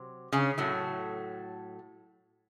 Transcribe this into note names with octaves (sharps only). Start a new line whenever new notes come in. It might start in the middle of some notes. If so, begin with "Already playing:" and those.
Already playing: C3 F#3
C#3 C#4
A2 F#3 A3